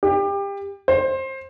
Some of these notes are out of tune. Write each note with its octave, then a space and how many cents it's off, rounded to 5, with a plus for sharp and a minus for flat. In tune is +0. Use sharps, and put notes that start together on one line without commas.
G4 +25
C5 +20